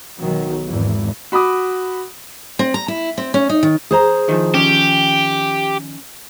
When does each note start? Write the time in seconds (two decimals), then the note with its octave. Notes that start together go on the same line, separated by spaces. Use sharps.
0.21 B1 D#3 F#3
0.68 G#1 E2 G#2 E3
1.32 F#4 B5 D6 D#6
2.59 C4
2.74 A#5
2.88 E4
3.18 C4
3.34 C#4
3.49 D#4
3.63 D#3
3.91 G#4 C5 A#5
4.29 D#3 F3
4.54 C#4 G4